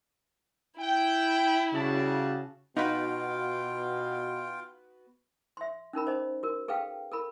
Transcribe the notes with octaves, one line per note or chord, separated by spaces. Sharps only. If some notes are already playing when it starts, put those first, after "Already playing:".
E4 G5
C#3 G3 F#4 G#4 A5
B2 B3 D#4 F4 F#4 B4 F5 G5
E5 C6
C#4 D#4 A#4 B5
C5 D#5
F#4 A#4
G#4 A4 B4 F5 G5
A4 A#4 B5